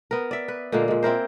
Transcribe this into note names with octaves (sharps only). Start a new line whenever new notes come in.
B3 A#4
D5 E5
B4
A#2 D3 G#3 A#3
A#2 G#3
C4 E4 A#4 C5